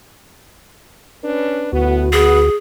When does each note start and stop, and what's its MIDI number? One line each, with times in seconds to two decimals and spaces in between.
1.24 1.68 61
1.24 1.68 62
1.24 1.68 71
1.73 2.49 38
1.73 2.07 45
1.73 2.07 57
1.73 2.07 59
1.73 2.49 66
2.13 2.41 59
2.13 2.56 68